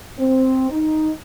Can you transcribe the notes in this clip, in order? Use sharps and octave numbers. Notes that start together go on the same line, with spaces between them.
C4
D#4